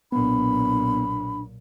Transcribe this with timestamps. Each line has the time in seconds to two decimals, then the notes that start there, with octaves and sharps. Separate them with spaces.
0.12 B1 A#2 B3 D4 B5